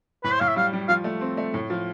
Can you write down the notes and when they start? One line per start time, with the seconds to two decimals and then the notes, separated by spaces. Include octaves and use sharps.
0.24 A2 B4
0.32 C5
0.40 A2 F5
0.48 E5
0.56 G3 F5
0.73 G3
0.89 F3 F5
1.04 A3
1.21 C4
1.37 A3
1.54 A2
1.70 F3